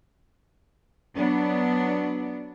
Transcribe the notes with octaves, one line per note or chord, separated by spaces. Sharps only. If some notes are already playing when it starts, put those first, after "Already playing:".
F#3 B3 D4